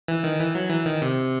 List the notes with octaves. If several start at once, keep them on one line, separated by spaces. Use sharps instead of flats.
E3
D#3
E3
F#3
E3
D#3
C3